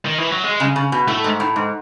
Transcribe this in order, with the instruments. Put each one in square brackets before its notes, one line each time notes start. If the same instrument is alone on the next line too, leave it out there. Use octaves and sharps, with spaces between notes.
[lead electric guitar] D#3
E3
F#3
G#3
[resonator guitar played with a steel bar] C#3
C#3
B2
[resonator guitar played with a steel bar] A2 [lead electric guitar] A3
[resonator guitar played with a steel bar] G#2
A2
G#2